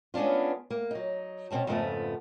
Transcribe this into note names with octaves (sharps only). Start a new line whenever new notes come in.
G#3 B3 C#4 D4 F4
A#3
F#3 D#4
B2 C4 C#4 A5
F2 G#2 C#3 F3 A3 B3